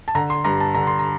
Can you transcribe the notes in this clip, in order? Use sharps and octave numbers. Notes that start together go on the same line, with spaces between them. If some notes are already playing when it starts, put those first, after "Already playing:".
A5
D3 A#5
C6
G2 A#5
A5
D3 A#5
C6
A#5